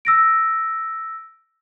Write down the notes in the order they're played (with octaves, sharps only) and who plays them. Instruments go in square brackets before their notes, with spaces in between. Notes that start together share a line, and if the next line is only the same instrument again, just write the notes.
[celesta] E6 A#6 D7